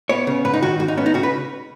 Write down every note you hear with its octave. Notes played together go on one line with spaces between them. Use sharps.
B3 C#5
C#3
G#2 B4
D#4
D#3 F#4
G#2 F#4
D#4
B3 C#4
D#4
C#3 F#4
B4